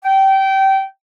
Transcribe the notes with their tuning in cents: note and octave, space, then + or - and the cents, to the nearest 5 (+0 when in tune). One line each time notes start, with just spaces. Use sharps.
G5 -20